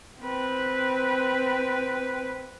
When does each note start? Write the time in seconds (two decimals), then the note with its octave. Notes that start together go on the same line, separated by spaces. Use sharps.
0.20 C4 B4